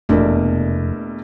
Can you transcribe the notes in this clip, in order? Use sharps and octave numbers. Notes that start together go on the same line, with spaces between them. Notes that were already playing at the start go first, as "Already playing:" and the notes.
F1 E2 B2 A3 A#3 D4